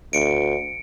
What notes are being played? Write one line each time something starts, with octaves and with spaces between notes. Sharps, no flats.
D2 C#7 D7